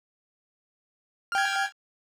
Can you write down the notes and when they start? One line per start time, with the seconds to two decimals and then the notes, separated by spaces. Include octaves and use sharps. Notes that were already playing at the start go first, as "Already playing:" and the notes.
1.32 F6
1.35 G5
1.38 G#6